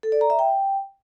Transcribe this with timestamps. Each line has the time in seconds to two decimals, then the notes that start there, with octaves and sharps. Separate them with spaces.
0.03 A4
0.12 D5
0.21 A#5
0.30 E5
0.39 G5